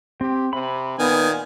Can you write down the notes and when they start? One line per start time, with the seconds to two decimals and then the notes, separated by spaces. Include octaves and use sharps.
0.21 C4 G4
0.53 C3 B5
0.99 A#2 D#3 B3 G#5 D#6